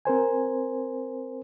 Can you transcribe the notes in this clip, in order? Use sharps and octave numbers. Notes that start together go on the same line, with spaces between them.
C4 A#4 C5 G#5